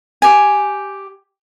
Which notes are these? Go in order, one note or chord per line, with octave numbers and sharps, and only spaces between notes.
G4 G#5